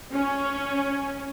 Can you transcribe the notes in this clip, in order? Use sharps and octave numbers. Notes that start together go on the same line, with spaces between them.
C#4